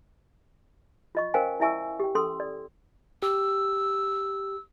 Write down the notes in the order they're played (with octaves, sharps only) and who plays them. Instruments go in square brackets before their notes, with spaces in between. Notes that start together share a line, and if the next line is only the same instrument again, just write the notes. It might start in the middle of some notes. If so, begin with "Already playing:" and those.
[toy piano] F4 D#5 C#6
C#4 A#4 C5 F5 G5 G#5
E4 D5 E5 G#5 C#6 E6
G4 G5
C#4 A4 C6 D#6 E6
D5
[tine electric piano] G4 [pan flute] E6